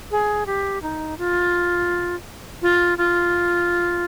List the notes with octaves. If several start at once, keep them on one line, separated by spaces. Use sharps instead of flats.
G#4
G4
D#4
F4
F4
F4